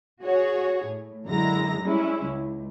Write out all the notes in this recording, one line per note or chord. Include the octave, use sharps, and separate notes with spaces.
F#4 G#4 C#5
A2
F#2 D3 G#3 E4 A#5 A#6
G3 G#3 C#4 E4
C#2